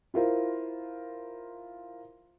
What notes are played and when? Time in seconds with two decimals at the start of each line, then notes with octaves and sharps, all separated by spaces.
0.14 E4 F4 A#4 C5